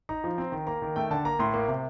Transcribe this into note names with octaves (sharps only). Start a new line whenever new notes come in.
D#4 A#5
F3
C4
D#3
A#3 A#5
D#3
A3 G5
D3 A5
A#3 A#5
A2 C6
A#3
C3